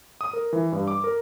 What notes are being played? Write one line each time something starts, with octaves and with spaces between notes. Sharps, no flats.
D#6
A#4
E3
G2
D6
A#4